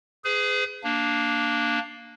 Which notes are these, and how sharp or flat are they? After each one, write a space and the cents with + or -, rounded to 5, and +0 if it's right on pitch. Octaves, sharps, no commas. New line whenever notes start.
G#4 +0 B4 +45
A#3 +0 D4 +0